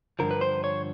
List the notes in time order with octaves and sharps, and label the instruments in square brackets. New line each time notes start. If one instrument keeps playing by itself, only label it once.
[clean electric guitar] G2 D3 F3 A#4
B4
C5
C#5